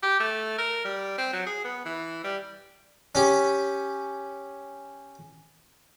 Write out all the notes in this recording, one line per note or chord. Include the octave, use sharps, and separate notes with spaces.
G4
A3
A#4
G3
C4
F#3
G#4
B3
E3
G3
C#4 G4